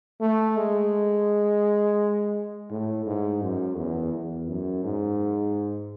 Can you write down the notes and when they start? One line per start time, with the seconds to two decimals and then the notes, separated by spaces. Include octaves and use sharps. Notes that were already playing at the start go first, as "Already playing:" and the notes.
0.21 A3
0.57 G#3
2.71 A2
3.06 G#2
3.42 F#2
3.77 E2
4.13 E2
4.48 F#2
4.84 G#2